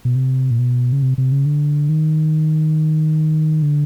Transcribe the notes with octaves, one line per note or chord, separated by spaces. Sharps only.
B2
C3
A#2
B2
C#3
C3
C3
C#3
D3
D#3
D3